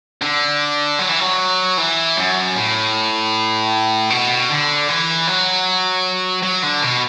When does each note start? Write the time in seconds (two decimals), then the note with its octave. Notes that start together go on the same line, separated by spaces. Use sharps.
0.22 D3
0.99 F#3
1.09 E3
1.20 F#3
1.78 E3
2.17 F#2
2.56 A2
4.10 B2
4.49 D3
4.88 E3
5.27 F#3
6.43 F#3
6.63 D3
6.82 B2